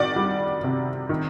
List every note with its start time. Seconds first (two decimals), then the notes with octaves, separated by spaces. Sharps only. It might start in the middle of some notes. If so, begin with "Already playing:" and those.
Already playing: D#3 F#4 D5
0.16 G3
0.63 C3
1.09 D#3